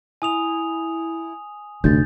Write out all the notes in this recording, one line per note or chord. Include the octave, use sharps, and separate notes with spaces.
E4 G#5 D#6 F7
F1 D2 G6 A6